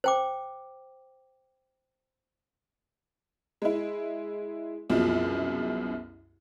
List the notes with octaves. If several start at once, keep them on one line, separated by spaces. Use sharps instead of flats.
C5 G5 D6
G#3 E4
C2 F#2 B2 F3 G#3